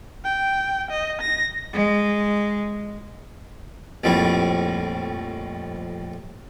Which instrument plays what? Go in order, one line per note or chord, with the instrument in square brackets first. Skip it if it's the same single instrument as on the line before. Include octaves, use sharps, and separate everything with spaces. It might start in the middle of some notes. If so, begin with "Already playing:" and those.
[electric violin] G5
D#5
A#6
[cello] G#3
[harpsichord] A#1 F2 A2 G3